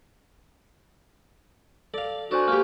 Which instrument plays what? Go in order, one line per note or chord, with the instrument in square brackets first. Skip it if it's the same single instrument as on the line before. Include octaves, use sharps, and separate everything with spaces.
[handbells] A4 [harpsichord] D5 F5
[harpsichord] D4 [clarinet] F#4 [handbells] A4 C5 G#5
[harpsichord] A#3 G4 [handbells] C#6 F6